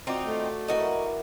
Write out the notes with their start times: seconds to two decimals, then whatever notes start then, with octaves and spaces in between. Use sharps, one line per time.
0.07 C4 D#4 F4 F#4 D5
0.25 A3
0.68 E3 F#4 A#4 D#5